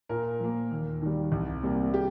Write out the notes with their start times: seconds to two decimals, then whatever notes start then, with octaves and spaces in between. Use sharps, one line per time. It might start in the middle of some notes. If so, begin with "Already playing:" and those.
0.09 A#2 A#4
0.40 F3 A#3
0.71 D#2
1.02 D#3 G3
1.32 C2
1.63 C3 G3 A#3
1.94 G4